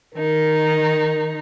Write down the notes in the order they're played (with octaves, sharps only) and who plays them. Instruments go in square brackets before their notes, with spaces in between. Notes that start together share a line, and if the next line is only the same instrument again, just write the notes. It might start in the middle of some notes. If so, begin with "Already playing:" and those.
[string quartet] D#3 D#4 [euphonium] A#4